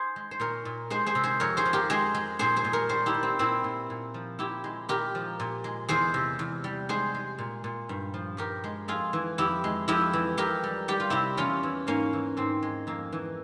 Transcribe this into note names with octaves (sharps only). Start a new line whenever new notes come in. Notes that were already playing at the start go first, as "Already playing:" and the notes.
Already playing: G#4 C5
G#3
C5
A#2 A#4 C#5
A#2
G#3 G#4 C5
G#4 C5
C3
G#4 C5
F2 A#4 C#5
G#4 C5
F3
G4 A#4
G#3 G#4 C5
G#3
A#2 G#4 C5
G#4 C5
A#2
A#4 C#5
G3 G#4 C5
E4 G4
G3
C4
A#2 C4 E4
A#2
A#2
F3
A#2 E4 G4
G#3
A#2 G4 A#4
F3
A#2
G#3
E2 G#4 C5
C3
E2
G3
G#3 G#4 C5
G#3
A#2
A#2
G2
F3
G2 G4 A#4
G#3
F2 F4 G#4
E3
F2 E4 G4
G#3
F2 E4 G4
E3
F2 G4 A#4
G3
G3 G4
F4
C3 E4 G4
E2 C#4 F4
E3
G#2 A#3 C#4
E3
G#2 C4
G#3
F2 A#3
E3